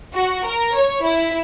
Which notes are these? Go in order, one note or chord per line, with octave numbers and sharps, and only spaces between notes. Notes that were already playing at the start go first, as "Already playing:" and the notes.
F#4
A#4
C#5
E4